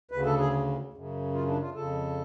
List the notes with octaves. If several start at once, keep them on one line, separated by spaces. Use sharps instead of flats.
D2 C#3 B4
A4
G#4
F#2 C#3
F4
D4
F4
F2 C#3 A4